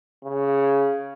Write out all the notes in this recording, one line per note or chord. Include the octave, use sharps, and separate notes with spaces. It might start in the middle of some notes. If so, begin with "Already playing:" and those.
C#3